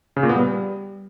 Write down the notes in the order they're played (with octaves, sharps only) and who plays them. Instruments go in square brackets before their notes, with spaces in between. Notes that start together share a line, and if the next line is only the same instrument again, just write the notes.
[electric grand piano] C#3
A#2
B3
G3